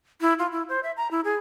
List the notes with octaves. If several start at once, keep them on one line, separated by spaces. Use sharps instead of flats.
E4
F4
E4
C5
E5
A#5
E4
G#4